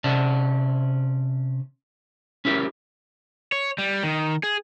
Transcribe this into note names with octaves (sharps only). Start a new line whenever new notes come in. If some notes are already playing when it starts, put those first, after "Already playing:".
C3 C#4 D5 A5
C#4 E4 G4 A#4
C#5
G3
D#3
G#4